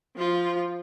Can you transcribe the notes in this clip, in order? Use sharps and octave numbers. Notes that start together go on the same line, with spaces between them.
F3 F4